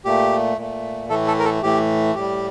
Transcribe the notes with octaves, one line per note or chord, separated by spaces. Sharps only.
A#2 A3 G4
A#2 A3
A2 E3 A3 A4
A4
A#4
A4
A2 E3 A3 G4
A2 G3 G4